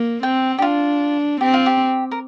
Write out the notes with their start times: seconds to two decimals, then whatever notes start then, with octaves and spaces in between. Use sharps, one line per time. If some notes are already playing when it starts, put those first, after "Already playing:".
Already playing: A#3
0.23 C4 G5
0.58 G4
0.62 D4 F4
1.41 C4 G4
1.54 F4
1.66 G4
2.11 A#4